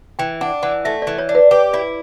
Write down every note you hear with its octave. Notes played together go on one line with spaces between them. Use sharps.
E3 G5
D4 F#5
E3 F#5
A3 E5
E3 D5
C#5
D4
B4
G4 B4
E4 D5